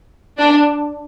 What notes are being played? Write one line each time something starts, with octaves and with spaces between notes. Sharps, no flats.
D4